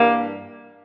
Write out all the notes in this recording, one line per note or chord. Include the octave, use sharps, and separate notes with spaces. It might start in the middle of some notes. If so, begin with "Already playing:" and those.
Already playing: G2 E3 G3 A#3